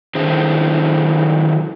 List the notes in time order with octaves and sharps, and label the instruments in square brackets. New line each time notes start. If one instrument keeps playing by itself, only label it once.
[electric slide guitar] D3 D#3 F#3 E4 G#4 C5